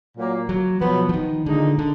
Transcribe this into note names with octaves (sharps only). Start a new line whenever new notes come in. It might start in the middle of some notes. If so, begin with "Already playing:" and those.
A#2 F#3 A#3
F#3
B2 F3 F#3 B3
F3
D#3
A#2 D3 G#3 D#4
D3